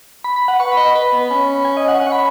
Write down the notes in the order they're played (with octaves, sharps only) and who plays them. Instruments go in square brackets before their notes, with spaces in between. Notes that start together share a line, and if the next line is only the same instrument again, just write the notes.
[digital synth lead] B5
B5
F#5
[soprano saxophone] B4 [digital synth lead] C#6
[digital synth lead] B5
[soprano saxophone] D#5
[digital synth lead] B5
[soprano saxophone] B4 [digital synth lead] B5
[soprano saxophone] B3
C#4
[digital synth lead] G#5
D#5
F#5
[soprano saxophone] C#4 [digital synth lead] F#5
[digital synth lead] C#6
B5